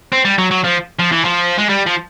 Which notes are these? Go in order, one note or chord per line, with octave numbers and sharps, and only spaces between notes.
C4
G3
F#3
F#3
F3
F3
E3
F3
G#3
G3
F3